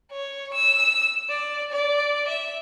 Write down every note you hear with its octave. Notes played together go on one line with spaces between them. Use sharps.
C#5
E6
D5
D5
E5